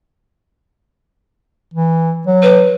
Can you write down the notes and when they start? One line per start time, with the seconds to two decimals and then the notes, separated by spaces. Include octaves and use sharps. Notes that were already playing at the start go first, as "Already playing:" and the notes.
1.74 E3
2.27 F#3
2.42 B4